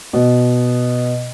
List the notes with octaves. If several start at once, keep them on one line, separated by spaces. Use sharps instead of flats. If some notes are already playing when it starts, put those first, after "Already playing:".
B2